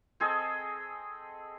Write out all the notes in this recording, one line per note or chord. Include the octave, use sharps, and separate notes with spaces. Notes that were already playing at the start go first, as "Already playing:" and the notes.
C4 G#4 A4 D#5